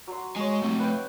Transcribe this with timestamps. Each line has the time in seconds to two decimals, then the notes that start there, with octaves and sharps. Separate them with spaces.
0.07 F#3 C6
0.36 G#3 C#5 D#5 G#5
0.62 A3 C4 G5
0.80 B4 G5